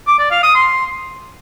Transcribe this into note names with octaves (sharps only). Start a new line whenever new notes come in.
D6
D5
F5
D#6
C6